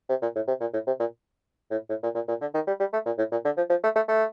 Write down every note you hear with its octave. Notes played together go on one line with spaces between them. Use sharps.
C3
A#2
A2
C3
A#2
A2
C3
A#2
A2
A2
A#2
A#2
A#2
D3
D#3
G3
G3
A3
A#2
A2
A#2
D3
F3
F3
A3
A3
A3